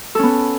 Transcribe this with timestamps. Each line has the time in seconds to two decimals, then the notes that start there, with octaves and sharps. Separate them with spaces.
0.15 A4
0.19 C#4
0.23 B3